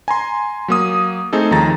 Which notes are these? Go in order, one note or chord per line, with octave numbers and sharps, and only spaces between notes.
G#5 A#5 C6
F#3 A#3 D#6
A3 C4 D#4 G#4 A4
D#2 D#3 F3 G#3 A#5 A6